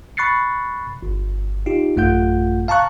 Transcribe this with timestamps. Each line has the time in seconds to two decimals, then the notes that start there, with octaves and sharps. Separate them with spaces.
0.17 B5 C#6 F#6 A6 C7 C#7
1.02 G1
1.66 D#4 F4 G4
1.96 A1 F#2 A3 F4 F#5 G6
2.68 F5 A5 A#5 C#6 F#6